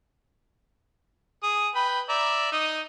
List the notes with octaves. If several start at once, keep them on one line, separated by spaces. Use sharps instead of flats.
G#4 D#6
B4 G5 B5
D5 E5 A#5
D#4 D#6